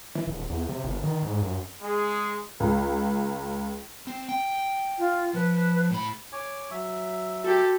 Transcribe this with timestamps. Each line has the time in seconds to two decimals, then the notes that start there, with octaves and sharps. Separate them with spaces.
0.15 E3
0.27 D#1
0.50 E2
0.69 C3
0.84 G1
1.03 D#3
1.22 G#2
1.42 F#2
1.81 G#3 G#4
2.60 C#2
4.07 C4
4.29 G5
4.98 F4
5.34 F3 B4
5.90 A2 B5
6.32 C#5 G#5 D6
6.71 F#3 E5
7.44 F#4 G4 A4